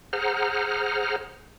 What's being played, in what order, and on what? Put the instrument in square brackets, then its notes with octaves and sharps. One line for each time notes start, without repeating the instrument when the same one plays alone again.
[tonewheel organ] G#4 C5 F#5 A#5 F6